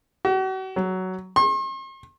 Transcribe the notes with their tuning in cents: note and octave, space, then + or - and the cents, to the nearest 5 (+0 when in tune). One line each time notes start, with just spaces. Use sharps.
F#4 +40
F#3 +10
C6 +45